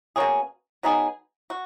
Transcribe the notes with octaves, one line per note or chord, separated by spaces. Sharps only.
B2 A#3 C#4 G#4
F#3 B3 D#4 G#4
F#4